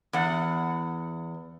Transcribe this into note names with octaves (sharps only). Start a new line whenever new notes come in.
E2 F#5